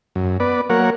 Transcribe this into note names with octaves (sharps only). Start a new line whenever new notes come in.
F#2
B3 B4 D5
F#3 A#3 A#4 C#5 F#5